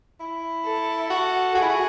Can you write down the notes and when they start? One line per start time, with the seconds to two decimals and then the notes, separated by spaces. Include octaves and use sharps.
0.20 E4
0.65 A4
1.10 F#4
1.55 F#4 G#4
1.62 E4
1.69 F#4